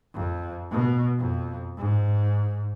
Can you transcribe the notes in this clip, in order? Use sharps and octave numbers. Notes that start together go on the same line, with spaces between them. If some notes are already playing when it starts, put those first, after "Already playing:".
F2
B2
F2
G#2